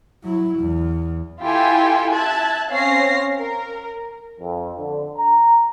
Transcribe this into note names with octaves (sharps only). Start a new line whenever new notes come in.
F#3 E4
E2
E4 F4 G4 A4 G5 G#5
E5 A5 F#6 G#6
C4 C#4 C#5 F5 A#6 C7
A#4
F2
D3
A#5